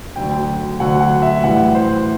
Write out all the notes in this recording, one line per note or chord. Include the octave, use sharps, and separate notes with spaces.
D2 D3 F#3 G5
D2 D3 F#3 F#5
F#5
E5
A2 E3 G3 F#5
C5